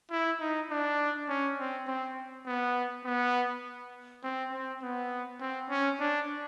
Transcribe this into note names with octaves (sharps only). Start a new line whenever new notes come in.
E4
D#4
D4
C#4
C4
C4
B3
B3
C4
C4
B3
C4
C#4
D4